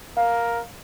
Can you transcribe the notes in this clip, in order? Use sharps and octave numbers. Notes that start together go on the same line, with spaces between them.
A#4 F5